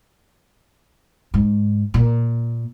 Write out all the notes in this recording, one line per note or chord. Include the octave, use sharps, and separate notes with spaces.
G#2
A#2